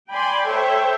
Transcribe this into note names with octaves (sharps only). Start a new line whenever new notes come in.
D5 G5 G#5 B5 C6
A4 C5 C#5 E5 G5